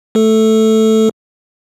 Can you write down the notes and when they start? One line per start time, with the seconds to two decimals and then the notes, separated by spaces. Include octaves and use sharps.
0.15 A3 A4